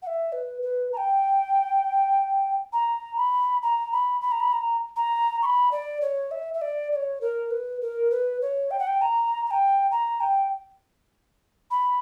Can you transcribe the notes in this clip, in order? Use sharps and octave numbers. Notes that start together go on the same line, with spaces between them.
F#5
E5
B4
B4
A#5
G5
A#5
B5
A#5
B5
B5
A#5
B5
A#5
A#5
C#6
B5
D5
C#5
E5
E5
D5
D5
C#5
A#4
B4
A#4
B4
C#5
G5
F#5
G5
A#5
A#5
G5
A#5
G5
B5